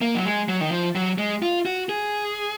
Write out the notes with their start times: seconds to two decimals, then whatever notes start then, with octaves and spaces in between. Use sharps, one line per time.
0.01 A#3
0.15 F#3
0.25 G#3
0.48 F#3
0.61 D#3
0.72 F3
0.95 F#3
1.18 G#3
1.42 F4
1.66 F#4
1.89 G#4